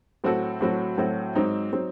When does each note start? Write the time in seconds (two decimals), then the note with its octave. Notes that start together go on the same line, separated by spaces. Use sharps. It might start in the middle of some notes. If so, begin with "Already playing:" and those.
0.24 A2 F#3 C4 F#4 A4
0.61 A2 F#3 C4 F#4 A4
0.98 A2 F#3 C4 F#4 A4
1.35 G#2 F#3 C4 D#4
1.73 F#3 C4 D#4